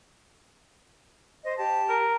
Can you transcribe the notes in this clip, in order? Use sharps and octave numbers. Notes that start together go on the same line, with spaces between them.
C5 D#5
G4 A5
A#4